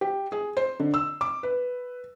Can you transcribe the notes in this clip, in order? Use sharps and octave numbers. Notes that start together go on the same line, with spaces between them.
G4
G#4
C5
D3
E6
D6
B4